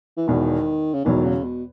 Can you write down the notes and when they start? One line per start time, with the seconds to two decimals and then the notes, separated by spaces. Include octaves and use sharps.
0.17 E3
0.28 E1 E2 B2 D#3
0.94 C#3
1.04 E1 E2 B2 D#3 F#3
1.24 C#3
1.43 B2